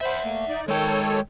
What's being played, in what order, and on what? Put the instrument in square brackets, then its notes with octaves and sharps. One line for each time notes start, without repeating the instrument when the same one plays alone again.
[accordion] C5 B5 [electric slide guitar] E5 F#5
[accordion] A3 A#3
D#4 D5
[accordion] D#3 A4 C#5 [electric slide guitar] G#3 G5